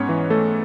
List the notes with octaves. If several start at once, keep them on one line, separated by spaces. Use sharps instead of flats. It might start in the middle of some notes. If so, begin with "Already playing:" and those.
Already playing: G#2 B3 C#4 C#5
E3
A3 A4